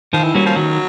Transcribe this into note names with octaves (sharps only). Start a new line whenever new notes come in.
D#3 F3
E3
F#3 G3 A#3 C#4
F3
D#3 F#3